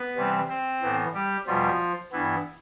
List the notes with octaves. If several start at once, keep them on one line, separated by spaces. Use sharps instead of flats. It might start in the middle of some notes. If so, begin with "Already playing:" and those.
Already playing: B3 B4
C3 E3 G3 C4
C4 C5
A2 E3 B3
G3 G4
E2 B2 F3 G3 B3 F4
G2 E3 B3 E4